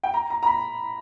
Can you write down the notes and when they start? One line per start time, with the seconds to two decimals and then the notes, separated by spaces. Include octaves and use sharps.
0.04 G5
0.14 A#5
0.30 A#5
0.43 A#5
0.47 B5